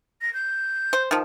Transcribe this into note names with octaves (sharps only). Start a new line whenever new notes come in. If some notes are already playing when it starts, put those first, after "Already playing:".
A#6
G6
C5
D#3 F3 A5